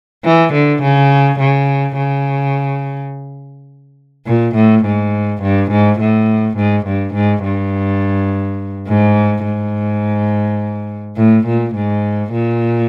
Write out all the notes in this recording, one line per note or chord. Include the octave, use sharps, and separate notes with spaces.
E3
D3
C#3
C#3
C#3
A#2
A2
G#2
G2
G#2
A2
G#2
G2
G#2
G2
G#2
G#2
A2
A#2
G#2
A#2